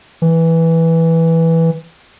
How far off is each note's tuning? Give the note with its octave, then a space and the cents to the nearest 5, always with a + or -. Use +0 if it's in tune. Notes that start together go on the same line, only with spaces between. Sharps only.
E3 -5